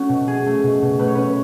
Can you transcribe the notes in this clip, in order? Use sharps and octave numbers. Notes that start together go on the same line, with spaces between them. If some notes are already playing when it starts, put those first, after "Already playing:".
Already playing: A3 C#4 F#4
B2
C#4 G#4
A3
B2
B2
A3 B4
C#5
C#4 B4